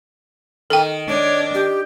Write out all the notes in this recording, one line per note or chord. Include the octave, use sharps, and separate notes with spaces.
D#3 A4 G5
D4 C#5
G4